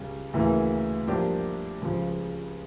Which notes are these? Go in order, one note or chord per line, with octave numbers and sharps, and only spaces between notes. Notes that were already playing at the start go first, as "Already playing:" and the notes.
Already playing: C#2 C#3 G3
D2 C#3 E3 A#3 E4
G2 F3 A#3 D4 G4
C#2 C#3 F3